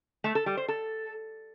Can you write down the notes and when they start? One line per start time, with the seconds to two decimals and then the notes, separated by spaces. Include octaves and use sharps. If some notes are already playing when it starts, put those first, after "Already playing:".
0.24 A3
0.35 A4
0.46 G3
0.57 C5
0.68 A4